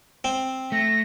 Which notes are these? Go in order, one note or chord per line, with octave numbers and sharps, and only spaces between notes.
C4
A3 A#6